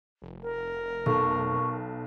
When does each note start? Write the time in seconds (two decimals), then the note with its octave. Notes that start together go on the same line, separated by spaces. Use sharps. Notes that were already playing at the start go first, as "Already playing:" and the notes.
0.22 F1
0.42 A#4
1.06 B1 A4 C#6